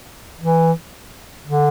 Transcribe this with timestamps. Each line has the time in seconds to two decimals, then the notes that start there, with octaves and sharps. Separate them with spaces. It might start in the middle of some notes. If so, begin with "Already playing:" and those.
0.40 E3
1.46 D3